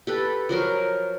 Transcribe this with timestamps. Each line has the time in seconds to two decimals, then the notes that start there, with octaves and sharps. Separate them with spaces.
0.07 G4 A4 B4
0.49 F3 F#3 A#4 C#5